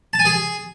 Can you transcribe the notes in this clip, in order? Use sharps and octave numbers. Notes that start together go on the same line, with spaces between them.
A5
G#5
G#4